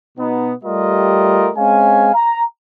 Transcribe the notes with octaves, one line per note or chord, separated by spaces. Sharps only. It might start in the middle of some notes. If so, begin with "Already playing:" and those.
B2 B3 D#4
G3 A3 F4 G4 A#4 D#5
G#3 C4 C#4 F5 G#5
A#5